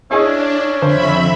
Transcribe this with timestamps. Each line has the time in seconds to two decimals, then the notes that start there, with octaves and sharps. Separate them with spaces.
0.11 C#4 D4 E4 G#4 D#5
0.82 F2 D3 C5 E5 B5